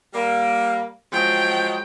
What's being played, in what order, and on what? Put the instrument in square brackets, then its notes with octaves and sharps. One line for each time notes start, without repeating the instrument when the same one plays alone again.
[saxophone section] G3 A#3
[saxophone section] F3 F#3 G#3 [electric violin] G5